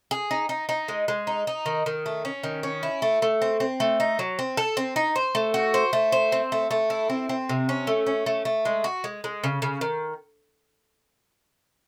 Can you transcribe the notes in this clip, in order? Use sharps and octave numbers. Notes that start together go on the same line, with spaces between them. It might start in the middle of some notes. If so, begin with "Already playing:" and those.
G#4
D#4
D#4
D#4
G#3
G#3
D#4
D#4
D#3
D#3
A3
C#4
D#3
C#4
E4
A3
A3
C4
C4
A3
D#4
F#3
C4
A4
C4
D#4
C5
A3
F#4
C5
A3
C5
C4
A3
A3
E4
C4
C4
C3
C#4
A3
C#4
A3
A3
G#3
F#4
G#3
G#3
C#3
C#3
D#3